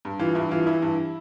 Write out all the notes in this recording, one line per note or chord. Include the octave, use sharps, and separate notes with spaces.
G2
E3 F4
G2 E4
E3 F4
E3 E4
G2